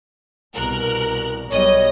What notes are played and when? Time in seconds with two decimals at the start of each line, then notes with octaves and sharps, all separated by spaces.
0.54 C2 B2 A#4 F#6
1.51 B1 G3 C#5 D#5